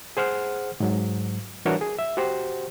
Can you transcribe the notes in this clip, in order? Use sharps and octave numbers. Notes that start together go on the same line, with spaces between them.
G#4 C5 F#5 F6
G#2 F#3
E3 G3 D4 F#4 A#4 C#5
G#4
E5
F#4 G4 C5